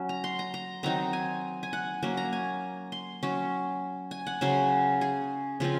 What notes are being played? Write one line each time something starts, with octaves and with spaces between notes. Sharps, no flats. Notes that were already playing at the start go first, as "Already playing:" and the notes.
Already playing: F#3 C#4
A#5
C6
A#5
A#5
D#3 F#3 C4 D#4 A#5
G#5
G#5
F#5
F#3 A#3 C#4
A#5
G#5
C6
F#3 C#4
G#5
F#5
C#3 F#3 C#4 C5
G#4
C#3 F3 C4 F4